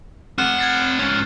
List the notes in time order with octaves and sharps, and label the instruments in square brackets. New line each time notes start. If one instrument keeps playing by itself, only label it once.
[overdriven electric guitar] C4 F#5 [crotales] F6 F#6 E7
[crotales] G#6 A6 C7
[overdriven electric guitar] G#2 C#4